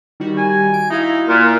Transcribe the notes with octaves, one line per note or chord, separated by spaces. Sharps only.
D#3 G3 F#4
G#5
D7
D#4 E4 F#4 F5
A#2 F4